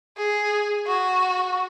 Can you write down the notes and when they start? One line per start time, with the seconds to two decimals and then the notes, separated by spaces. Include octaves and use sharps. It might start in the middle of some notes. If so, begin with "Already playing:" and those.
0.17 G#4
0.87 F#4